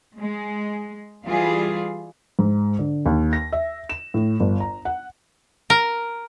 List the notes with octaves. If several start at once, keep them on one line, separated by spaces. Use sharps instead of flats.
G#3
E3 G3 F4 G#4
G#2
D3
D#2
A#6
E5
E7
A2
G1
A#5
F#5
A#4